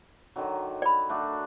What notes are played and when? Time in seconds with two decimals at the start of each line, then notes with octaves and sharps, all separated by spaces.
0.36 D3 D#3 F#3
0.82 D5 B5
1.09 A3 D4 F#4